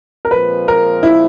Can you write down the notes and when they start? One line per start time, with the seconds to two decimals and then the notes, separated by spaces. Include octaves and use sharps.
0.25 A#4
0.31 A#2 F3 G#3 C4 B4
0.68 A#4
1.03 E4